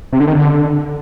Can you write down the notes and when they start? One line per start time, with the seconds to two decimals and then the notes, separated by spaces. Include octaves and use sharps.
0.13 C3
0.20 D3
0.27 D#3
0.35 D3